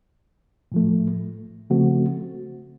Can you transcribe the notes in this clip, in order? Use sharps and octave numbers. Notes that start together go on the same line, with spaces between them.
A2 F3 A3
C#3 F3 A3 C4 F#4